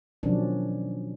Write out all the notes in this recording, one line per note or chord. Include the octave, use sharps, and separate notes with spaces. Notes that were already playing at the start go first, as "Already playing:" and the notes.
B2 D#3 F3 F#3 C#4 D4